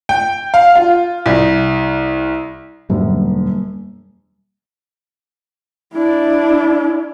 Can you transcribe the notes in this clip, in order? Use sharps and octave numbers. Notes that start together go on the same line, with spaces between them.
G5
F5
F4
C2
E1 F#2 D3 G3 A#3
D4 E4